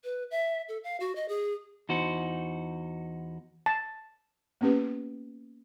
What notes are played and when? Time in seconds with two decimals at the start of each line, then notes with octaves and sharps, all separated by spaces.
0.04 B4
0.31 E5
0.69 A4
0.84 F5
1.00 F#4
1.16 D#5
1.29 G#4
1.89 E2 D#4 F#4 C5
3.66 A5
4.61 A#3 B3 C#4 G4 B4